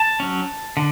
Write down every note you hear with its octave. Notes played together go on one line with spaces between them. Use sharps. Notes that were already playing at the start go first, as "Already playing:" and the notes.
Already playing: A5
F#3 C#4
D3